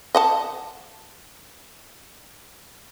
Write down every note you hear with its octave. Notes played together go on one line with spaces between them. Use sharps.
D#5 F#5 A5